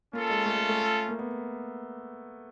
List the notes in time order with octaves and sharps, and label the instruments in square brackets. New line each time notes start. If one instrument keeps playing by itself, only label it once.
[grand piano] A#3 [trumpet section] C#4 F4 A4
[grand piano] G#3
A3
G#3
A3
A#3
B3